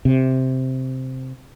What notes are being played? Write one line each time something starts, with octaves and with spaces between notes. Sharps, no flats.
C3